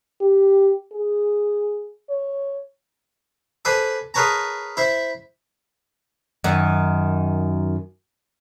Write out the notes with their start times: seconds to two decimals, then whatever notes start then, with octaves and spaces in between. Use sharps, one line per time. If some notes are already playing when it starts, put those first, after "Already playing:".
0.21 G4
0.92 G#4
2.10 C#5
3.65 A4 B4 C5 D5 G#5 A5
4.14 G#4 A#4 B4 C#5 A5 A#5
4.77 E4 C5 E5
6.44 F#2 D#3